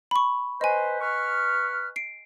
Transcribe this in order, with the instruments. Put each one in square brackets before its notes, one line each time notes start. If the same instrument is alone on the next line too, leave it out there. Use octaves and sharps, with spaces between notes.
[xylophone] B5 C#6
[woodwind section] B4 C5 [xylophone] D#5 G#5
[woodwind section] B4 C#6 F6
[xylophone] C7 D7